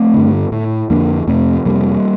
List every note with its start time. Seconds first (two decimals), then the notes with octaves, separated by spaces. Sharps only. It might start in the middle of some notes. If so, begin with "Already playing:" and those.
Already playing: A3 C4
0.14 G2 D3
0.52 A2
0.90 F2 D3 A#3 D4
1.27 F2 C3 A3 C4
1.65 F2 C3 G3 A#3